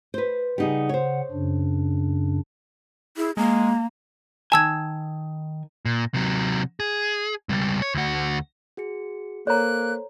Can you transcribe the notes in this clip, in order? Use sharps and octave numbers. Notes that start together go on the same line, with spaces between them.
B4 C5
C#3 G3 D#4 G#4 F#5
C5 C#5
F#2 C#3 D4
E4 G#4
G#3 A#3 A#5
D#3 G#5 A5 E6 G#6
A#2
C3 F#3
G#4
C#2 G3
C#5
D2 F#4
F#4 G#4 C#7
A#3 A4 C5 C#5 A#5 F#6